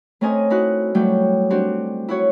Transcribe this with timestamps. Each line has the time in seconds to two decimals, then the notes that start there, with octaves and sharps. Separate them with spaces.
0.21 A3 C4 C#4 A#4 D#5 G#5
0.50 D#4 E4 F#4 F#6
0.95 F#3 G3 A3 G5 G6
1.50 C4 D4 F#4 G4
2.09 E4 F#4 C#5